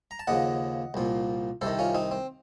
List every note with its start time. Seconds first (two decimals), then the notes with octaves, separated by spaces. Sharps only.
0.11 A#5
0.19 A5
0.27 D#2 C#3 F3 D#5 F#5
0.94 C2 A#2 F3
1.61 C2 C3 D#3 A4 C5
1.79 C#4 F4
1.95 C4 D#4
2.11 C4